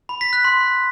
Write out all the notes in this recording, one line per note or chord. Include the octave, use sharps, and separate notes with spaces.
B5
B6
F#6
C6